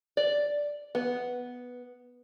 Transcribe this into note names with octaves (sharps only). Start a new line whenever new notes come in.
D5
B3